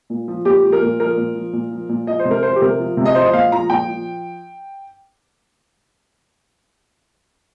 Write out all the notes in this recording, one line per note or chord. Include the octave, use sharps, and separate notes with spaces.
A#2
F3
A#2 G4
F3
A#4
A#2
F3 A#4
A#2
F3
A#2
F3
A#2
F3 D#5
C5
C3
A#4
F3 C5
G4
C3 A#4
F3
C3
D#5
F3 C5
D#5
A#2 F5
F3 A#5
A#2 G5
F3